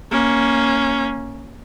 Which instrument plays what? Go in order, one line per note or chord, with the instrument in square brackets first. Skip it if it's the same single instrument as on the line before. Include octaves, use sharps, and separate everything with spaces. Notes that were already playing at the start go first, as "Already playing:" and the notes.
[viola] A#3 C#4